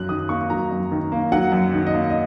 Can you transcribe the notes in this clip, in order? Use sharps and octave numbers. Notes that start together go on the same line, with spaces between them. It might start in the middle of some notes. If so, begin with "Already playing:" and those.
Already playing: F#2 F#3 F#6
D#3 D#6
A#3 C#6
F#3 A#5
F#2
D#3
A#3
F#3 F#5
F#2
D#3
D#5
A#3
D#5